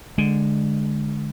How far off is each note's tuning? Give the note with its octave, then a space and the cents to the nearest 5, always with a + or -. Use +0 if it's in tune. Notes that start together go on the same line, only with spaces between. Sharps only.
D3 +5 G#3 +10